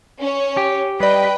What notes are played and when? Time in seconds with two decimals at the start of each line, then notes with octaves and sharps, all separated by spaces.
0.21 C#4 C#5
0.57 G4
1.00 G3 B4 D5 D#5 G5